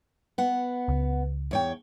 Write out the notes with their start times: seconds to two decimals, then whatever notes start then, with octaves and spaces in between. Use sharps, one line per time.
0.38 B3 F#5
0.88 C#2
1.51 E2 C#5 G5